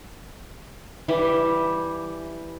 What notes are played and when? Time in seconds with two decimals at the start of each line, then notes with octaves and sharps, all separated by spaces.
1.08 E3 G3 G4